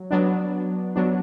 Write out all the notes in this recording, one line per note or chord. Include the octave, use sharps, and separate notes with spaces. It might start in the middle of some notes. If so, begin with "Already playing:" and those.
Already playing: F#3
F#3 B3 D4
F#3 B3 D4